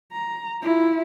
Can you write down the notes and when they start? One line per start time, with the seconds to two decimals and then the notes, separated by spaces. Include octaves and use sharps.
0.13 A#5
0.62 E4 F4